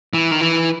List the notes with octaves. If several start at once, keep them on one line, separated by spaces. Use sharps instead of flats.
E3
D#3
E3